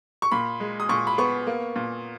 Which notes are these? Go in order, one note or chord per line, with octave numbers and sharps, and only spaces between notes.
C#6
A#2 B5
G#3
D#6
A#2 C#6
B5
B3 C#6
A#3
A#2